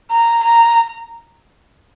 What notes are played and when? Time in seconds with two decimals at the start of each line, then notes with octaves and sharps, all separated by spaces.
0.11 A#5
0.43 A#5